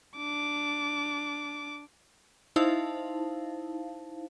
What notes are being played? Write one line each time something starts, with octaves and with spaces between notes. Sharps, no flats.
D4 D6
D#4 E4 C5 F5 A5